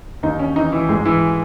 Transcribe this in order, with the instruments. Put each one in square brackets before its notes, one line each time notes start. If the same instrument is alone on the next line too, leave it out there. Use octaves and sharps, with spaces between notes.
[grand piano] D#2 D#4
C#4
E3 D#4
E3 E4
G#2 G#3 G#4
E3 E4